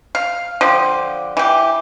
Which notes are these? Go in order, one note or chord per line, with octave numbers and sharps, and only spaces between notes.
F5
D3 F3 G4
E3 G4